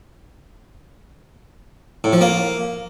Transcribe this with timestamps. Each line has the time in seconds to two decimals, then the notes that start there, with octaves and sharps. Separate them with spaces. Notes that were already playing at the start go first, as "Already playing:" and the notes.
2.04 A2
2.13 F3
2.21 A#3